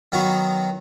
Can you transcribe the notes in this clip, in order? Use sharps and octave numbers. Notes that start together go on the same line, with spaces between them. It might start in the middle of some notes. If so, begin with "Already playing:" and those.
D#3 F#3 B3 D#4 F#4